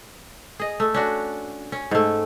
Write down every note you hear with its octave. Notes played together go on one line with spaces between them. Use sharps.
G#4 D#5
A3
C#4 D4 F#4
C#4
G#2 A3